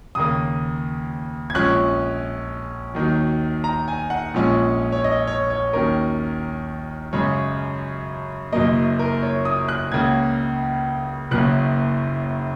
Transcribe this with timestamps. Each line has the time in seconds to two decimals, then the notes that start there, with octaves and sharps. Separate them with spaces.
0.15 D#2 C#3 A#3 D#6
1.50 G#6
1.55 A#1 A#2 G#3 C#4 F#6
2.95 D#2 D#3 F#3
3.64 A#5
3.88 G#5
4.10 F#5
4.34 A#1 A#2 G#3 C#4
4.92 C#5
5.04 D#5
5.27 C#5
5.50 C#5
5.73 D#2 D#3 F#3 C#4 A#4
7.13 F#2 C#3 G#3 C#4 C#5
8.52 F#1 F#2 F#3 A#3 D#5
8.99 A#4
9.22 C#5
9.45 D#6
9.68 F#6
9.92 C#2 C#3 A#3 G#6
11.31 F#1 F#2 C#3 A#3 F#6